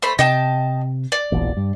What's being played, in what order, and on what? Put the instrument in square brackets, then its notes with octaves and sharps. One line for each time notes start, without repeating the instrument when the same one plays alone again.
[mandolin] A3 C5 B5
[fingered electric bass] C3 [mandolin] D#5 G5 A5
[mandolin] D5
[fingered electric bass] E1 A#1 E2
G2